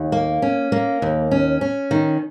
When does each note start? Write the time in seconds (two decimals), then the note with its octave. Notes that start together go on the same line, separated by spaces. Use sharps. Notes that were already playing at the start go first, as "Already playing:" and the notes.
Already playing: D#2
0.12 A#3
0.42 C#4
0.72 A#3
1.02 D#2
1.31 C#4
1.61 C#4
1.91 D#3